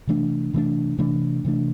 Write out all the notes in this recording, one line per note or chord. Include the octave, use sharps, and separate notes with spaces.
C3 E3 A3 D4
C3 E3 A3 D4
C3 E3 A3 D4
C3 E3 A3 D4